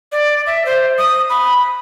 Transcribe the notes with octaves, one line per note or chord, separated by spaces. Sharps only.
D5
E5
C5
D#6
B5